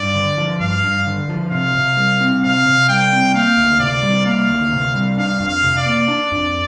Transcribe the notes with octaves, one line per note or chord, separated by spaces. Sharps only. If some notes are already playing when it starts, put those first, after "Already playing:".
Already playing: G2 D5
D3
F3
G2 F5
G2
D3
F3
C3 F5
C3
G3
C4
C3 F5
C3
G3 G5
C4
A#3 F5
D2
C3 D5
G3
A#3 F5
D2
C3
G3
D4 F5
F2
F5
C3
D5
A#3
D4
F2